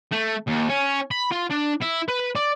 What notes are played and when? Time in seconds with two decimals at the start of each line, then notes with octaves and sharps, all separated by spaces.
0.12 A3
0.48 D#2
0.70 C#4
1.11 B5
1.32 F4
1.51 D4
1.82 E4
2.08 B4
2.36 D5